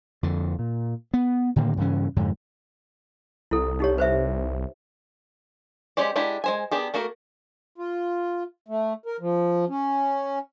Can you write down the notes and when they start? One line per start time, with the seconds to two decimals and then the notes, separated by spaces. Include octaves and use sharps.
0.23 F2 D3
0.59 A#2
1.14 B3
1.56 A2 D3 D#3 A#3
1.77 G2 C#3 E3 C#4
2.16 F2 G#2 D3
3.51 C2 E4 A4
3.80 D#4 G4 C#5
3.98 B4 C5 E5
5.97 G#3 C#4 G4 C5 D5
6.16 G#3 D4 E4 G4 F#5
6.44 G#3 C5 G#5
6.71 B3 D4 G4 G#4
6.94 A3 A#3 F#4 A#4
7.78 F4
8.68 A3
9.06 A#4
9.20 F3
9.69 C#4